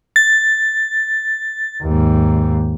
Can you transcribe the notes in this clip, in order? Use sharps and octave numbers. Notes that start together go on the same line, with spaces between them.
A6
D#2 G#2